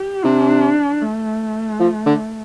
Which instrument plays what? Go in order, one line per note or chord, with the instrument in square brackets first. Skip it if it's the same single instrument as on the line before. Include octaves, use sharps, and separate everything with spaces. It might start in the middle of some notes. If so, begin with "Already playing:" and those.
Already playing: [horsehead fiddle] G4
[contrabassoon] C3 [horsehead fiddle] D4
[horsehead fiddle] A3
[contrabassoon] F3
D3